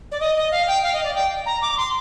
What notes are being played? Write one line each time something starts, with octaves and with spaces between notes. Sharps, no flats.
D5
D#5
D#5
F5
G5
F5
D#5
D5
G5
A#5
D6
D6
C6